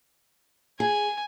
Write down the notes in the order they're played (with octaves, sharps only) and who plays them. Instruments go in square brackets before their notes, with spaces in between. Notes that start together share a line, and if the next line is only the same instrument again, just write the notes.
[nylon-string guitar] G#4 [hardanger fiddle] G#5